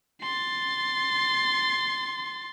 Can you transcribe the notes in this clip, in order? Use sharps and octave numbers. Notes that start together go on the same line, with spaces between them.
C6 A6